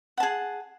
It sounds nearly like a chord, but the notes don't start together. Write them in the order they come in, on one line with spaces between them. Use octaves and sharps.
F#5 A5 G#4